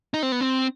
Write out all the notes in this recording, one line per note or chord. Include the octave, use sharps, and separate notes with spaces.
D#4
C4
B3
C4